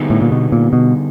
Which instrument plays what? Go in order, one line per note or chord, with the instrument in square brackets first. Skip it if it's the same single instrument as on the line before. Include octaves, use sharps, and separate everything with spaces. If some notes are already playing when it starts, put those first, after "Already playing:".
Already playing: [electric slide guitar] D3 G3 B3 D#4 G#4
[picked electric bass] A2
A#2
B2
A#2
B2